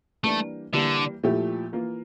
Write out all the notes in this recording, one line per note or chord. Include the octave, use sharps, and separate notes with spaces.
E3 G3 A3 A#3 D4
D3 E3 G3 A#3 E4 G4
A#2 F3 A3 E4 G4
E3 A#3 F4